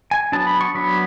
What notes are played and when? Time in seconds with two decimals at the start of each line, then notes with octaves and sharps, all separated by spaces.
0.11 G#5
0.32 F#3 B3 D4 A5
0.47 B5
0.61 C#6
0.75 F#3 B3 D4 B5